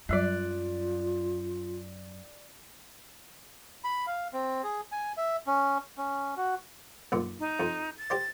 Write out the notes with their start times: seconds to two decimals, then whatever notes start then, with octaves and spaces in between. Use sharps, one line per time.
0.09 F#2 F#3 G3 F4 D5 D#5 F#6
3.84 B5
4.07 F5
4.33 C4
4.64 G#4
4.92 G#5
5.17 E5
5.47 C#4
5.98 C#4
6.37 F#4
7.12 B1 F#2 A#2
7.40 D#4
7.60 F2
7.98 A6
8.10 G4 C5 D5